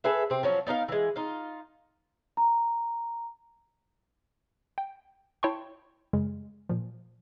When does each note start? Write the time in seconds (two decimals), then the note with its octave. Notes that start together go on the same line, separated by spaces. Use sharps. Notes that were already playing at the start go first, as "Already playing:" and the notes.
0.04 G#4 A4 B4 E5
0.30 C3 C4
0.43 F3 F#3 C#4
0.67 B3 D#4 A#4 F5
0.88 E3 G#3
1.16 D#4 F4
2.37 A#5
4.78 G5
5.43 E4 C#5 G5 A5 C6 C#6
6.13 F#2 C#3 G#3
6.69 A#2 F3